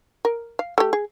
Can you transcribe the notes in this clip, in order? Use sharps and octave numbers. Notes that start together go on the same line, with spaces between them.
A#4
F5
A3 G4
G#4